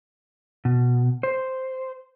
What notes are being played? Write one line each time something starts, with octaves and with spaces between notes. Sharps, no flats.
B2
C5